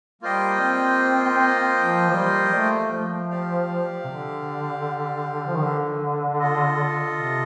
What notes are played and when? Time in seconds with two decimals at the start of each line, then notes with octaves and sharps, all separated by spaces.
0.21 G3 A#3 F4 C5 D#5 G5
0.60 C4
1.76 F3
2.10 F3
2.15 G3
2.54 A3
2.92 F3
3.30 G4 D5 F5
4.04 C3
4.07 D3
5.46 F3
5.55 D#3
5.63 D3
6.40 F4 A4 D#5
7.16 C3